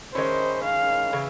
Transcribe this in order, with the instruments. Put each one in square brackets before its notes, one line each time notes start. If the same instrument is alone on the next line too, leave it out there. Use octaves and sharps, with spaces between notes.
[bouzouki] D#3 G#3 C#4 E4 [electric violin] C5
[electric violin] F5
[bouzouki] C#3 E3